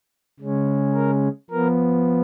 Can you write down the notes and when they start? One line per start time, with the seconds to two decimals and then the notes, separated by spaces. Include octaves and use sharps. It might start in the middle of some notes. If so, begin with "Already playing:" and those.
0.40 C#3 G#3 C#4
0.94 A#4
1.50 F3 B3 A#4